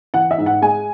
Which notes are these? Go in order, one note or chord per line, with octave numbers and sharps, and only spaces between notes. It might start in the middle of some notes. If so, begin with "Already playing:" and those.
E3 F#5
E5
G#2
F#5
G#3 G#5